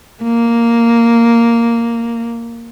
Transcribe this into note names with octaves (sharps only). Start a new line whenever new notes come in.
A#3